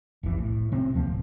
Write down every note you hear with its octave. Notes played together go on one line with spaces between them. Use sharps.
F1 B1 F2 E3
A2
C3 C4 C#4
D2 F3 G#3 A#3
D1